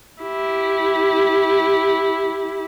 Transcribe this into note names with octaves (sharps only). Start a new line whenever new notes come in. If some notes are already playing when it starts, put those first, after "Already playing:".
E4 G4